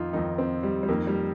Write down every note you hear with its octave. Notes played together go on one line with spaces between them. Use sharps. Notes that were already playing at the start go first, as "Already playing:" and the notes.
Already playing: F2 D#3 D#4 F4
F2 D#3 D#4
C4
G3
G3
F2 D#3 A#3
G3